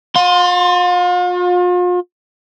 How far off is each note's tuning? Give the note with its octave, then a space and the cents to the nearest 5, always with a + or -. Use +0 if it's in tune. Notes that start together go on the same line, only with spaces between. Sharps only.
F4 +40 C6 +0